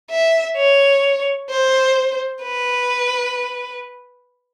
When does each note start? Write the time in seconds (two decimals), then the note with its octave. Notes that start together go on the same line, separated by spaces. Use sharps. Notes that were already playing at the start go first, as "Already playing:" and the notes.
0.10 E5
0.57 C#5
1.49 C5
2.43 B4